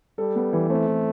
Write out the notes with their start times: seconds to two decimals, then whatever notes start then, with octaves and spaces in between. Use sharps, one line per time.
0.18 G3 A4
0.35 B3
0.53 E3
0.70 A3 C4
0.87 E3